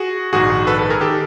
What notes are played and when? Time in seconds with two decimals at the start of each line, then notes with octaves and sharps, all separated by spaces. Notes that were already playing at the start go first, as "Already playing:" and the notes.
Already playing: F#4 G#4
0.33 A#1 G#2 D#3 F#4 G#4
0.67 A4 B4
0.79 A4 B4
0.90 G#4 A#4
1.01 D#3 G4 A4